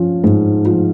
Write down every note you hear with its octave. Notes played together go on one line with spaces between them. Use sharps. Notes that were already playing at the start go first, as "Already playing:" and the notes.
Already playing: F3 C#4
G#2
F3